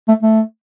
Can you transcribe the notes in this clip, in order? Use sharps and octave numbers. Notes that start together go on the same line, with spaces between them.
A3
A3